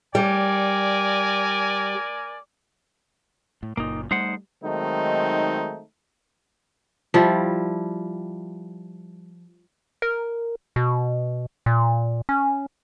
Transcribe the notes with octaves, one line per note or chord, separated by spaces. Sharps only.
G3 A#4 D5 G#5
A2
F#1 A#2 A#3 D#4
G3 A3 D#4 C5 F#5
D#3 F#3 G#3 A3 C4 D#4
F3 G3 E4
A#4
B2
A#2
C#4